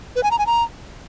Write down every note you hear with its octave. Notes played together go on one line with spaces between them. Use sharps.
B4
G#5
A#5
G#5
A#5